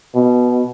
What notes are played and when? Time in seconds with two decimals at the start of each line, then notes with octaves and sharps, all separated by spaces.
0.15 B2